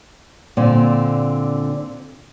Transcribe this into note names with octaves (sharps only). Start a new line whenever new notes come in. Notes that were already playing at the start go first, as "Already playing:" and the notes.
A#2 D3 C4 D5